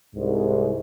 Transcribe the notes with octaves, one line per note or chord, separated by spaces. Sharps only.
C2 G#2